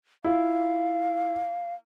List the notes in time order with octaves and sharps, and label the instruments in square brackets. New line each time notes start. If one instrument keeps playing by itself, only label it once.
[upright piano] E4 F4 [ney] F5